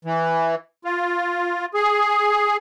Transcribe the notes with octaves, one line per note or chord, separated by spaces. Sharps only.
E3
F4
G#4